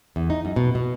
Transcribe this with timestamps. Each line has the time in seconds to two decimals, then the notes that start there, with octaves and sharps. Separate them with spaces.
0.16 E2
0.30 D#4
0.45 F#2
0.56 B2
0.75 B2